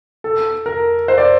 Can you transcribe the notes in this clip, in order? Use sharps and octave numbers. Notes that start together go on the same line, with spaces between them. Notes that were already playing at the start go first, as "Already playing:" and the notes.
A4
A#4
C5
D5